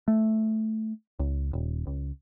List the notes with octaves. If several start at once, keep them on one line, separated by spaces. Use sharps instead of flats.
A3
C#2
D#1
C#2